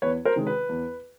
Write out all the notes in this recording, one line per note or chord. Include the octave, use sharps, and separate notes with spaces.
E2 B4 C#5
A#4 C5
C3 D#3 G#3 C#4
B4
E2